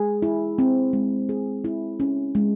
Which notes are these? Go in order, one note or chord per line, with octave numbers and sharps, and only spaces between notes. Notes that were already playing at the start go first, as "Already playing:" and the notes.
Already playing: G#3 G#4
E4
C4
G#3
G#4
E4
C#4
G#3